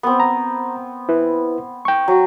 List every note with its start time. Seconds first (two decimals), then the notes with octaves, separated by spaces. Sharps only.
0.03 B3 C4
0.20 A#5
1.09 E4 B4
1.85 G5 C#6
2.08 F#3